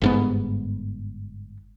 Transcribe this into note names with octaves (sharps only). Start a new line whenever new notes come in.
G1 G#2 B3